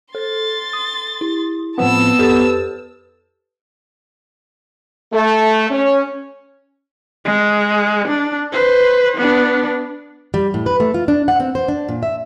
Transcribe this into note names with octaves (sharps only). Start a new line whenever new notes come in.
A4 C6 A6
D#6
E4
A2 F3 B3 C4 A5 E6
F2 G4 A4 B4 A6
A3
C#4
G#3
D4
B4 C5
B3 D4
G3
A2
B4
A3
F4
D4
F#5
C4
C5
D4
A#2
E5